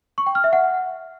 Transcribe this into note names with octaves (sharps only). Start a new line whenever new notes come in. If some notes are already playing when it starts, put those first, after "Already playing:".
C#6
G5
F6
E5
F#5